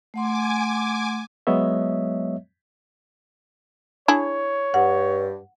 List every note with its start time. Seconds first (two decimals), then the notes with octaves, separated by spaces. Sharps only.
0.14 A3 F#5 G#5 C6 D6
1.47 F#3 G#3 B3 C#5 D#5 E5
4.08 D4 E4 G#4 C#5
4.74 G2 F#5